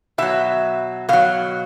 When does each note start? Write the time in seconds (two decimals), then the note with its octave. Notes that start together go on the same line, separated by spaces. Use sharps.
0.18 B2 F#3 E5
1.09 B2 F#3 F5